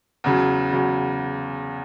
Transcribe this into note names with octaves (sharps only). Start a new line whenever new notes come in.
E2 C#3 F#3
E2 C#3 F#3